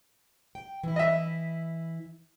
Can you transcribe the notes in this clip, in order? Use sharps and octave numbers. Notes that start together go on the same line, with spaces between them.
G5
E3 E4
D#5 E5